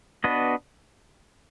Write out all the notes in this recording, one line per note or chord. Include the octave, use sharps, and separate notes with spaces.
B3 D4 F#4 B4 D#5